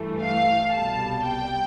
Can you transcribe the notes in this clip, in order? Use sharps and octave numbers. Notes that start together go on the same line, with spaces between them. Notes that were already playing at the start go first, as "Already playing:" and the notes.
Already playing: G2 E3 A3
F5
C2 B2 G3 A5
G5